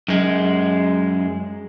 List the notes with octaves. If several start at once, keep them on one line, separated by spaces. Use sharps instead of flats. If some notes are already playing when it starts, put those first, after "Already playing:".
F#2 G#3